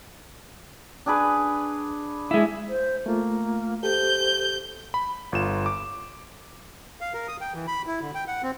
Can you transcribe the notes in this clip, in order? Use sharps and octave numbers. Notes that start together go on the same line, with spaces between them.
D4 G#4 B4
G#3 E4
C5
A3 A#3 F4
G4 A4 C5 G6
B5
G1 F4 E7
D6
F5
A#4
D#6
G5
E3
B5
E4
D3
G5
F#5
C4